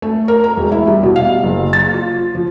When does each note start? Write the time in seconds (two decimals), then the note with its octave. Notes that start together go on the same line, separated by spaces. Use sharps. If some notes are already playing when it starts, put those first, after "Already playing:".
0.02 A3
0.28 A#4
0.44 A#5
0.57 E1
0.72 E4
0.87 G3
1.03 B2
1.16 F5
1.43 F#1
1.73 A6
1.94 F4
2.35 F3